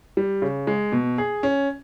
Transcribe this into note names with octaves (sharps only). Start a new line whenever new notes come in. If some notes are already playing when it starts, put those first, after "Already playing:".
G3
C#3
G#3
B2
G#4
C#4